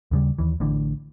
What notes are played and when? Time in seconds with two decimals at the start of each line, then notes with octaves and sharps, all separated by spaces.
0.11 D#2 C#3 G3
0.38 D#2 E3
0.60 A1 A2 D3 E3